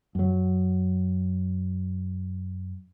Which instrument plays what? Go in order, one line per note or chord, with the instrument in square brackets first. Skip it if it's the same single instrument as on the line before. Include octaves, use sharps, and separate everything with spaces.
[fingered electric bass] F#2 F#3